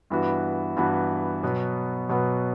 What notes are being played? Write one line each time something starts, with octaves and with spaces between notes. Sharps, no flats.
G2 E3 B3 F#4
G2 E3 B3 F#4
B2 F#3 B3
B2 F#3 B3